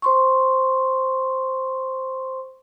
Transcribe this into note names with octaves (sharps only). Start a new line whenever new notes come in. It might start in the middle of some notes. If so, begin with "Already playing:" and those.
C5 C6 C#6